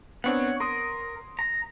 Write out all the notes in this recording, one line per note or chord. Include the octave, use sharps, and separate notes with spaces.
B3 C4 D4 C#5 F#5
A#4 C6 D#6
A#5